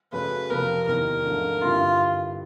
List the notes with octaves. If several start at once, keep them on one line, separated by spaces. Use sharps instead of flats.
F#2 C#3 F#3 A3 C#4 B4
F2 C3 F3 A#4
E2 C3 D#3 A#4
G#2 F3 A3 D4
G2 D3 G3 C4 E4 F4